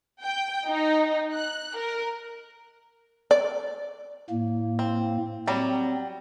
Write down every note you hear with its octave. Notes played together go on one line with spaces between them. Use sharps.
G5
D#4
F#6
A#4
D5
A2 A#3
C4
F#3 G3 C4